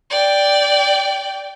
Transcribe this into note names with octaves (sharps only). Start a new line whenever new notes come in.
D5 G5